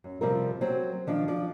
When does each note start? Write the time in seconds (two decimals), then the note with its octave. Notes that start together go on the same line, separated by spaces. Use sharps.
0.04 F#2
0.21 C3 F3 G3 C4 F4 A#4
0.61 F#3 C4 C5
1.07 D#3 F3 D4
1.28 F3 D5